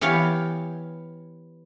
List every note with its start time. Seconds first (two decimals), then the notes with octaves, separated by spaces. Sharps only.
0.01 E3 B3 G4 C#5 F5